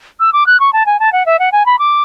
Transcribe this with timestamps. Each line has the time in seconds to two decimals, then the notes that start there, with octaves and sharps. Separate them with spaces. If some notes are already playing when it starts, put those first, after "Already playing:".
0.20 E6
0.33 D6
0.47 F#6
0.60 C#6
0.73 A5
0.86 G#5
1.00 A5
1.13 F#5
1.26 E5
1.39 F#5
1.52 G#5
1.66 B5
1.79 D6